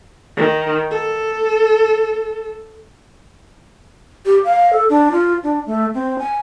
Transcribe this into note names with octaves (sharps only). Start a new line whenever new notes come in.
D#3
A4
G4
F5
A4
D4
F4
D4
A3
C4
G#5